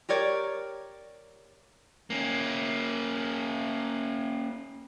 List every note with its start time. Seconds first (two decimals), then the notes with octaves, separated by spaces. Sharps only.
0.09 G4 A#4 C#5 D5
2.10 A#3 C#4